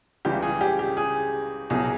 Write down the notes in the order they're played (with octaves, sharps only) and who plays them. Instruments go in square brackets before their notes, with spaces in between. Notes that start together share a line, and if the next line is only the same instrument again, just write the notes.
[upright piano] C#2 C#3 E3 G3 G4
G#4
G4
G4
G#4
C2 B2 F#3 G#4